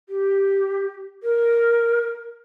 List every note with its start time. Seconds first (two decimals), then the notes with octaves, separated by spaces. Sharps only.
0.09 G4
1.23 A#4